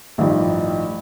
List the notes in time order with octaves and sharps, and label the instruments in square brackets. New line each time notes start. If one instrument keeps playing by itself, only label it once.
[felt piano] A1 G2 D#3 F3 G4